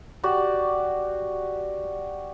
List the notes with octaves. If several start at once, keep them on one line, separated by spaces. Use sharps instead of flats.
F#4 G4 D5